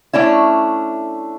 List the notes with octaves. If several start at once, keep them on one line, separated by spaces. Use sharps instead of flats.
A3 C#4 D4 E4